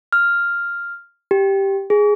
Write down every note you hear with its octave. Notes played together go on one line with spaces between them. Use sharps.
F6
G4
G#4